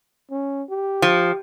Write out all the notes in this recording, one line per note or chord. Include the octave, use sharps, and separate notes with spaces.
C#4
G4
F3